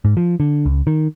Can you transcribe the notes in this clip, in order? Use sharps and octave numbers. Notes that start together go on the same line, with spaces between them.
G#2
F3
D3
C#2
D#3